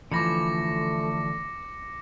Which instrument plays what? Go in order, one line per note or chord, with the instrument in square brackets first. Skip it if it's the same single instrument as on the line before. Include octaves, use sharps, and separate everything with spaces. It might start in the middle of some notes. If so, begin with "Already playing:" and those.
[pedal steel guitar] D3 B5 [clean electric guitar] E3 F3 [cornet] A3 [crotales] D6 A#6 C#7